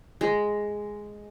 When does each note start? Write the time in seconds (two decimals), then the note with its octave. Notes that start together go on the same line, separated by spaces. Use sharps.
0.21 G#3